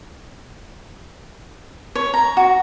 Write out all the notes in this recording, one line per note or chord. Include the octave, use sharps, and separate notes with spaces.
C#5
A#5
F#4